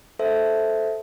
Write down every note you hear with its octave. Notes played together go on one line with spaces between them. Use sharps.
A4 C5 E5